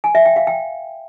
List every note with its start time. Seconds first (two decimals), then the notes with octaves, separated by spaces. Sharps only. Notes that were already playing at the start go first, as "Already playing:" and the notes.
0.04 G#5
0.15 E5
0.25 G5
0.36 F5
0.47 G5